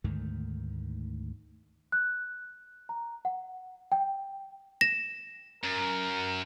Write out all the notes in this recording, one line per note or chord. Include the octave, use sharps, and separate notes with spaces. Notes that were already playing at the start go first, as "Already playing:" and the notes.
D2 G#2 D#3 A3
F#6
A#5
F#5
G5
A#6 E7
F#2 A#4